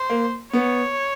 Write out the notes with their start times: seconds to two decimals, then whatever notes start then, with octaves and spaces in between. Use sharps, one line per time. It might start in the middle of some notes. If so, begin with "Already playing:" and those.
Already playing: C5
0.10 A#3
0.53 B3 C#5